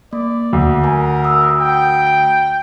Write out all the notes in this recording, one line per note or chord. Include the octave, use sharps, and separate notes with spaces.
A#3 D5
D2
A#4 G#5 A#5
D#6 E6
G5
D7